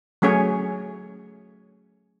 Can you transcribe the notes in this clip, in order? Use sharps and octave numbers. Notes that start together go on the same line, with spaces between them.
F#3 A3 C#4 G#4 C#5